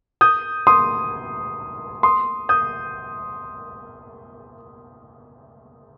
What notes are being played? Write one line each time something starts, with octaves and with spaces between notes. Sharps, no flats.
D#6 G6
C6 D#6
C6 D#6
D#6 G6